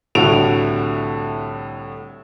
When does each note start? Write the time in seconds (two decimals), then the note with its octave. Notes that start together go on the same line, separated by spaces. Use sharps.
0.15 C2 A2 D3 F#4 D7 F7